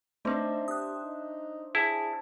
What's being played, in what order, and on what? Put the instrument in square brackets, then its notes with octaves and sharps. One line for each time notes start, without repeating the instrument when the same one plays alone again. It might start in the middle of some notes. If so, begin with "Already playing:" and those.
[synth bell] A3 C4 [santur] D4 C5 E5 [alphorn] D#4
[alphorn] G4 [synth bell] D#6 F#6
[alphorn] D#4
[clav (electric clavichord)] E4 [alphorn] G#4 [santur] A5